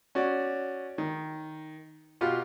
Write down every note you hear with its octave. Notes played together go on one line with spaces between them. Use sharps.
C#4 F#4 D5
D#3
B2 F4 G4